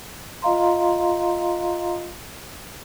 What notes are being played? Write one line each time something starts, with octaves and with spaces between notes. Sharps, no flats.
F4 D#5 F5 A#5 C6